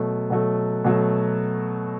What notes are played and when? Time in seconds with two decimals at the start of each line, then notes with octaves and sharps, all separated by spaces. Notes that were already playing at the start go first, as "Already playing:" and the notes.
Already playing: B2 F#3 A3
0.30 B2 F#3 A3
0.85 B2 F#3 A3